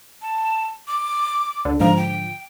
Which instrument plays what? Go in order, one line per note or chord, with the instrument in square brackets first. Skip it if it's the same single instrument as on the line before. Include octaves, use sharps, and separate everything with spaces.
[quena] A5
D6
[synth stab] D2 D3
[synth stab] G#2 D3 F3 [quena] A#5
[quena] G5